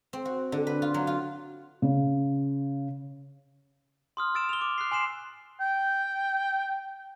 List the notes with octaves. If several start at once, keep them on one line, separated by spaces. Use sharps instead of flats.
C4
F#4
D3
B4
F4
F#3
F4
C#3
C6 D#6 F6
E6 A6 D7 E7
F7 G7
D6
F#6 C7
G#5 C6 C7 E7
G5